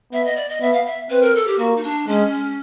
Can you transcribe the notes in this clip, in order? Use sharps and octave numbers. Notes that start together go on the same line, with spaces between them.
B3 E5
D#5
D5
D#5
B3 E5
F5
E5
C4 B4
A#4
A4
G4
A#3 F#4
D#4
D4
G#3 C#4